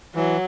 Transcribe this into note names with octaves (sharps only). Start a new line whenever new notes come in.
E3 F#3